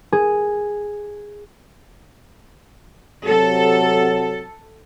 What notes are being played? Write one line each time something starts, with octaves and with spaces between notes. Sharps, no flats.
G#4
C3 F#3 A4